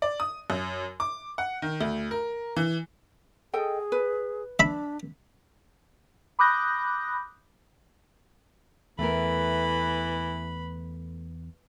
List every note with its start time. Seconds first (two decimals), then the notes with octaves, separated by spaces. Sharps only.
0.02 D5
0.20 D#6
0.50 F#2
1.00 D6
1.38 F#5
1.62 D#3
1.81 D2
2.11 A#4
2.56 E3
3.54 G#4 A4 D#5 G5
3.92 B4
4.59 D4 E5 B5
6.39 B5 D6 D#6 F#6 G6 A#6
8.99 E2 E3 A3 A#4 B4 B5